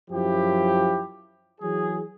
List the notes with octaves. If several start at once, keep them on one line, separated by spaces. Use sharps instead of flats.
F#2 F3 E4 G4
E3 F#3 G#4